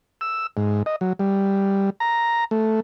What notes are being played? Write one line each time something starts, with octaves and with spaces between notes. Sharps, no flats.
E6
G#2
D#5
F#3
G3
A#5
A3